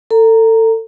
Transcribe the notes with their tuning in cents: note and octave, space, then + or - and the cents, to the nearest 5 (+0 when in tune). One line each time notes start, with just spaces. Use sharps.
A4 +30 A#5 -5